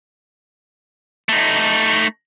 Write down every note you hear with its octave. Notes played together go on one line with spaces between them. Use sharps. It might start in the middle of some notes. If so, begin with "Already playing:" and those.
A3 D#4